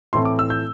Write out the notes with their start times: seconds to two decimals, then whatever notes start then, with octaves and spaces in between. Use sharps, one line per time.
0.13 A2 E3 A3 C4 C6
0.25 D6
0.39 E6
0.50 G6